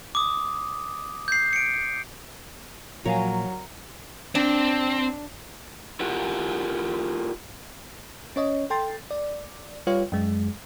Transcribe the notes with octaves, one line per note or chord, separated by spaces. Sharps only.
D6 D#6
G6 C7
C#7 D7
A#2 F3 F#3 A#4 C#5 F5 G#5
C4 D4
E4 F4 G4 A#4 F#5
C#4 C#5 D#5
A4 G5 C6 A6
D5
G3 F4 G4 B4 C#5 F5
F#2 G#3